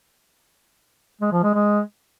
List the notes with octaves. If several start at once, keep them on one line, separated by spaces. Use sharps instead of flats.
G#3
F3
G#3
G#3